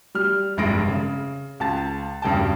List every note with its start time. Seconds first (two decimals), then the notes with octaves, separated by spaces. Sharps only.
0.15 G3 F6
0.57 F1 A#1 G2 G#3 A#6 D7
0.88 C#3
1.60 C#2 A5 A6
2.22 E1 G2 C#3 G5 A5